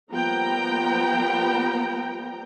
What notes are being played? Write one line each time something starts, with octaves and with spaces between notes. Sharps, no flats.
F3 G3 A#3 B3 G5 A#5